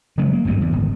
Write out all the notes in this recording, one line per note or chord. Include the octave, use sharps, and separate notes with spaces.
C#3 F#3 G#3 A3
A#3
G#1 D2 G2 D3
E2
D1 G#1